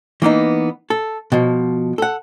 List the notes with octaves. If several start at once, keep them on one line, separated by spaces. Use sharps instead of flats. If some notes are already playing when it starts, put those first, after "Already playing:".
E3 A#3 B3 D#4
A4
B2 F3
A4 F#5